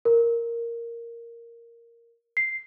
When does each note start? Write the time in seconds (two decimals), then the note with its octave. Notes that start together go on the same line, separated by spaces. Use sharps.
0.05 A#4
2.37 C7